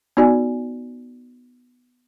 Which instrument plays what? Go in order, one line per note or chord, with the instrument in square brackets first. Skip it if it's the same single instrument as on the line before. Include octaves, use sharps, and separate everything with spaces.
[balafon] B3 D#4 F#4 D5 G#5